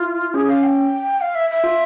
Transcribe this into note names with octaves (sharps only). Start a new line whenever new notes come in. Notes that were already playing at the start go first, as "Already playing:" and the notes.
Already playing: E4 F4
C#4 G#4
C#4 F5
G5
F5
E5
E5
F4